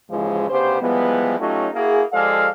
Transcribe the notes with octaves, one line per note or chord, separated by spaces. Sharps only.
D#2 G#2 C#3 E3 F3 G#3
D2 C#3 B3 G4 C5
E3 F3 G3 G#3 B3
F#3 A3 C#4 D#4 F4 G4
A#3 E4 F#4 G#4
F3 G#3 G4 A4 D5 F5